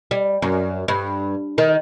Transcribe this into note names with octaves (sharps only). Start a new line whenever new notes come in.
G3
F#2
G2
D#3